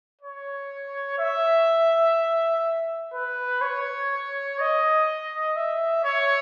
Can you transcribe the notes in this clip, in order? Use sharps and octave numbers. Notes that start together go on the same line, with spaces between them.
C#5
E5
B4
C#5
D#5
E5
C#5